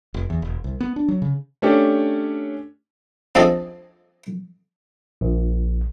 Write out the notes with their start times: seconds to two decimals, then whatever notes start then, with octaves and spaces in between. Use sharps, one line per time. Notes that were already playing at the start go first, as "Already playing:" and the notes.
0.14 F1
0.30 E2
0.42 E1
0.64 C2
0.80 B3
0.96 D4
1.08 F#3
1.22 C#3
1.62 A3 C#4 D4 G4
3.35 F3 C4 D4 G#4 A4 D#5
5.21 A#1